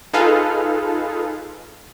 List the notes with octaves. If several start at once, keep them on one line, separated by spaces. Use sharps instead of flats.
D#4 F4 G#4 A4 B4 F5